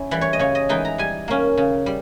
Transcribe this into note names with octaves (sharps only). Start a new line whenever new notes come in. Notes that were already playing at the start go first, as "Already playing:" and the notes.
Already playing: C#4 E4
E3 G3
C#5
D#5
C#3 C#5
D#5
E3 G#3 D#4 G5
A#5
G3 G#5
A#3 C#4
C#3
G3